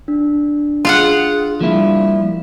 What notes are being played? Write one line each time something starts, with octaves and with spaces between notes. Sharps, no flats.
D4
F4 G#4 F5 F#5
F3 G3 A#3 E4